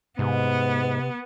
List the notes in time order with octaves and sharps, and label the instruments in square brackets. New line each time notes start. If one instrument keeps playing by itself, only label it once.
[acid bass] G#2 [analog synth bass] C3 [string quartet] B3